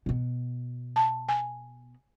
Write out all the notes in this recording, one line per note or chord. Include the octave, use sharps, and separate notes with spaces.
B2 B3
A5
G#5